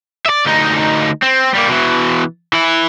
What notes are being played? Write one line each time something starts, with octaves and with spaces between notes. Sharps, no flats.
D5 E5
D2 D#4
C4
G3 A#3
B2 E3
E3 E4